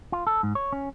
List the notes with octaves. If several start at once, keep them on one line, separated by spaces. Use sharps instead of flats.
F4
A4
G#2
C#5
C#4